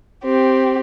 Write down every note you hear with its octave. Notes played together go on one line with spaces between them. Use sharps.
C4 G4